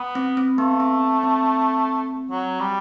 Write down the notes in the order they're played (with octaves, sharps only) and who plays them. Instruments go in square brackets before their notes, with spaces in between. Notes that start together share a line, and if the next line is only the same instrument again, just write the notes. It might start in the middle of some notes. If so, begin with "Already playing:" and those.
Already playing: [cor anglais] B3
[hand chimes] C4
C4
[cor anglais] A3 [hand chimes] B3
[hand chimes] C4
C4
[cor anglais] F#3
G3